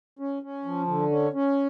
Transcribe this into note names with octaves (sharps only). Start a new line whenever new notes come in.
C#4
C#4
F3
D3
C#4
C#4